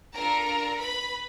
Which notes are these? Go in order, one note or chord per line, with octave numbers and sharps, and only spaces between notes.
D4 F4 A4 A#4 A#5
B4 B5